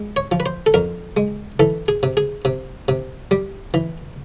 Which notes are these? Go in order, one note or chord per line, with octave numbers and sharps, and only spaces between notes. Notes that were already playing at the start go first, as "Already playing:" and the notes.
Already playing: G#3
C#5
F3
B4
C5
A4
F2 A#4
G#3
E3 A4
G#4
C3
G#4
C3
C3
G3
E3